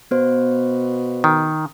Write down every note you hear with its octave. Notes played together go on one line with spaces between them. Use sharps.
B2 B3 C5
D#3